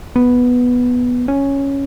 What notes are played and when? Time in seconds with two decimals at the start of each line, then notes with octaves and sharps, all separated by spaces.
0.16 B3
1.28 C#4